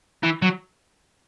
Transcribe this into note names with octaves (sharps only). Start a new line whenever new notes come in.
E3
F#3